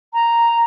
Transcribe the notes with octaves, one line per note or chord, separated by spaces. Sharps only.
A#5